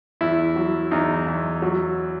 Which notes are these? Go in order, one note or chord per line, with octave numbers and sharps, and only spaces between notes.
E2 E4
F#3
E2 D#4
E2
F#3